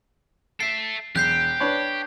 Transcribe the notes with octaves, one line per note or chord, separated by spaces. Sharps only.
A4 E5 C7 D7
E1 G4 F#6 G6 C7
D4 B4 C#5